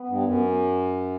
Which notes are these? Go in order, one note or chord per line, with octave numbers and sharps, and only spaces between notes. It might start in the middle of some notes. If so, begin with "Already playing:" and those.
Already playing: B3
G2
F#2